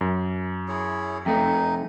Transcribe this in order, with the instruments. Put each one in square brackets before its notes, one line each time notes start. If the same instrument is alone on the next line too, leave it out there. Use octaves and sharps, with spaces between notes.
[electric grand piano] F#2
[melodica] E4 G#4 C#5
[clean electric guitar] F2 A3 [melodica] D#4